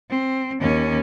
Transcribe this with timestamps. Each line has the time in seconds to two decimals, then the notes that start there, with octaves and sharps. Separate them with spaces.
0.10 C4
0.61 D#2 C#4